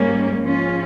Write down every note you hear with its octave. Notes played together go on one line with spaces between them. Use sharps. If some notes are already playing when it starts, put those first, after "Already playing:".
Already playing: G#2 G3 A#3 C#4
G#2 F3 G#3 C#4 F4